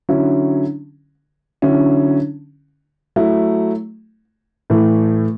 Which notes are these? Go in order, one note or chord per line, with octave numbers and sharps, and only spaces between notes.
D3 F#3 C#4 E4
D3 F#3 C#4 E4
F#3 A3 E4
A2 E3 A3